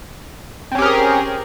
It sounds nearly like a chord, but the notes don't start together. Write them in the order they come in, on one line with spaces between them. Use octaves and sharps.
C4 C#4 G4 A#4 G#4